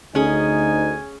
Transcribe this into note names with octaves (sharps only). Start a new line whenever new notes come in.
D2 C#4 D#4 G#4 G#5